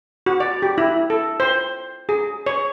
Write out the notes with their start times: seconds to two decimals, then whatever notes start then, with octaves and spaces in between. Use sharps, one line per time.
0.26 F#4
0.40 D5
0.62 G4
0.78 E4
1.10 A4
1.40 C5
2.09 G#4
2.46 C#5